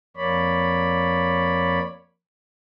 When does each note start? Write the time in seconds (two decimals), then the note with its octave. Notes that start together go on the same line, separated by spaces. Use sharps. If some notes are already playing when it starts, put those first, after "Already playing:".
0.17 F2 A#3 C#5 D5 B5